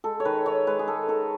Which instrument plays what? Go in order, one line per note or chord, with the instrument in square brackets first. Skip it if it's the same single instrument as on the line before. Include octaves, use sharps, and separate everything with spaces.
[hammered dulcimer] G#3 A4
C#5
D#3 B4
D#3 C#5
G#3 B4
G#4
G#3 A4
D#3 A4